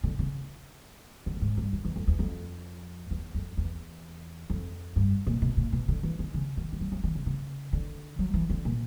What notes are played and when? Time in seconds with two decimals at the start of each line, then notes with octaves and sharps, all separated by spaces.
0.04 D3
0.19 C#3
1.26 D3
1.36 G2
1.42 G#2
1.57 G2
1.73 F#2
1.85 E2
1.96 F2
2.07 E2
2.19 F2
3.11 E2
3.34 F2
3.57 E2
4.50 F2
4.96 G2
5.27 A#2
5.42 B2
5.57 A#2
5.73 B2
5.88 D3
6.03 E3
6.19 D#3
6.34 C#3
6.57 D#3
6.73 F3
6.81 F#3
6.92 F3
7.04 D#3
7.15 C#3
7.26 C#3
7.73 D3
8.19 F#3
8.34 E3
8.50 D3
8.65 A#2